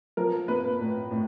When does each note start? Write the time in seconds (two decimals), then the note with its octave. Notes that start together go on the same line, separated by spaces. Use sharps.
0.17 F3 A#4
0.48 A#3 B4
0.80 A2
1.11 A2